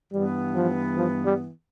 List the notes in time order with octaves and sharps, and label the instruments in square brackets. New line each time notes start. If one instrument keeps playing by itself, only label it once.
[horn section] G2 E3 B3 [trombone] G3
[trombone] F3
F3
G3